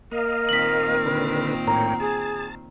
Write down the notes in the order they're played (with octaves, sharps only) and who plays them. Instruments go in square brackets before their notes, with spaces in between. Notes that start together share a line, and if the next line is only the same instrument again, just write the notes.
[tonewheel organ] A#3 D#5 F5 [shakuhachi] A#4
[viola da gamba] A#2 D#3 C4 [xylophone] B6 F#7
[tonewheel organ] D3 B4
[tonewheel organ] A2 A#4 C#5 [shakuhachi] G5 [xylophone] A#5
[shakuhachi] G#4 [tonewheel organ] A5